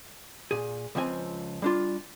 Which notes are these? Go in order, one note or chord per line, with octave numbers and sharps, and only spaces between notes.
A#2 G#4
C#2 F3 C4 G#5
G3 D4 F4